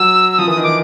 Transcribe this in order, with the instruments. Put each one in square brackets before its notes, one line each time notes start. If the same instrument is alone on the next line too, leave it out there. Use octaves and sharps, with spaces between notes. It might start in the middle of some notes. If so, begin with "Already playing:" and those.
Already playing: [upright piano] F#3 [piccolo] E6
[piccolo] E6
[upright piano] F3 [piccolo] D#6
[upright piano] E3
[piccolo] D#6
[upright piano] D#3
[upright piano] E3 [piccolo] D6